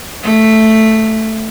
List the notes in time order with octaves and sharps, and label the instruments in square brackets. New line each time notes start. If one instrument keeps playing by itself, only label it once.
[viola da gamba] A3